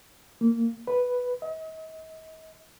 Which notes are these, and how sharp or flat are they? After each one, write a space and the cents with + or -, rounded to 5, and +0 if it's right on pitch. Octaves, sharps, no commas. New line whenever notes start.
A#3 -15
B4 +0
D#5 +40